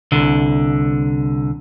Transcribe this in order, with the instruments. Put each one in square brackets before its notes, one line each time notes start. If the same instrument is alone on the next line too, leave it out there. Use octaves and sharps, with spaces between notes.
[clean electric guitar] C2 D3